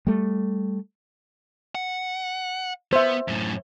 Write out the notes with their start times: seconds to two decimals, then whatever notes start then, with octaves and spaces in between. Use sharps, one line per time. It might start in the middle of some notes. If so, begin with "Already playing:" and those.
0.07 G3 A3
1.75 F#5
2.93 B3 C5 E5
3.28 F#2 A2